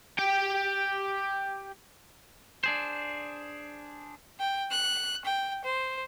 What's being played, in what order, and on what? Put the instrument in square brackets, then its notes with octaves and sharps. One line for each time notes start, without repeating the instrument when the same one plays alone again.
[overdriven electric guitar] G4 G5
[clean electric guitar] D4 G#4 C5
[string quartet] G5
F#6
G5
C5